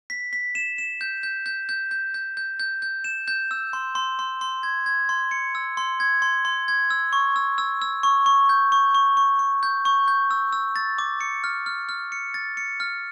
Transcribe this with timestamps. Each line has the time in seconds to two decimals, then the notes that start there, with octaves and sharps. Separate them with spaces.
0.10 B6
0.33 B6
0.55 E7
0.78 E7
1.01 G6
1.23 G6
1.46 G6
1.69 G6
1.91 G6
2.14 G6
2.37 G6
2.60 G6
2.82 G6
3.04 E7
3.28 G6
3.51 E6
3.73 C6
3.95 C6
4.19 C6
4.41 C6
4.63 G#6
4.86 G#6
5.09 C6
5.31 C#7
5.55 E6
5.77 C6
6.00 G#6
6.22 C6
6.45 C6
6.68 G#6
6.90 E6
7.13 C#6
7.36 E6
7.58 E6
7.82 E6
8.03 C#6
8.26 C#6
8.49 G6
8.72 C#6
8.94 C#6
9.17 C#6
9.39 C#6
9.63 G6
9.85 C#6
10.08 G6
10.31 E6
10.53 E6
10.76 A6
10.98 D6
11.21 C#7
11.44 F6
11.66 F6
11.89 F6
12.12 C#7
12.34 A6
12.57 C#7
12.80 F6